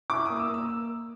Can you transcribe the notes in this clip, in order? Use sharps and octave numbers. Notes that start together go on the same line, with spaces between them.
E4 D6
A#3 D#6
E6
A#3
E6